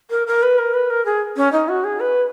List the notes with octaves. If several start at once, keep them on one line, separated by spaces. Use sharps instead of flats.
A#4
A#4
B4
A#4
B4
A#4
G#4
C#4
D#4
F#4
G#4
B4